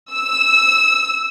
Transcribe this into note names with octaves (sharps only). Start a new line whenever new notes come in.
E6